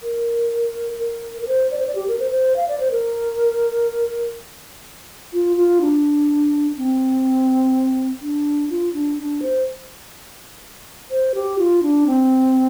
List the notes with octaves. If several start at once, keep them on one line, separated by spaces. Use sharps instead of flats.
A#4
A#4
A#4
C5
D5
C5
D5
G4
A#4
C5
C5
F5
D5
C5
A#4
F4
F4
D4
C4
D4
F4
D4
D4
C5
C5
G4
F4
D4
C4